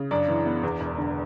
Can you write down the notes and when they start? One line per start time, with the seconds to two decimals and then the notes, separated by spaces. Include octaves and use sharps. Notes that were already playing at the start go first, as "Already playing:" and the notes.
Already playing: C#3
0.11 F#2 D4 D5
0.28 E3
0.46 B3
0.63 E2
0.80 E1
0.98 D3